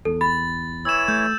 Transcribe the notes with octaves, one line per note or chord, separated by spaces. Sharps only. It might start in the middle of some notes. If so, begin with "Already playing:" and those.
E2 A4
B5 A6
E3 E4 C#5 E6 E7
A3 G6